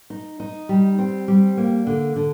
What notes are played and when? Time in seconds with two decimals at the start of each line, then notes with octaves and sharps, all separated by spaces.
0.10 D#4
0.40 D#4
0.69 G3
0.98 C4
1.28 G3
1.57 A#3
1.87 D3
2.16 D3